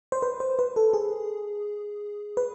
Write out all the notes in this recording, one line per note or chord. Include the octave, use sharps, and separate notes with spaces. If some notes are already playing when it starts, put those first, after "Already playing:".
C5
B4
C5
B4
A4
G#4
B4